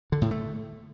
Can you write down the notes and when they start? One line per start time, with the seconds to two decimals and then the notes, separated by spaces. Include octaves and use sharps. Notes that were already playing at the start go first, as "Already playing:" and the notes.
0.12 D3
0.22 A2
0.31 A3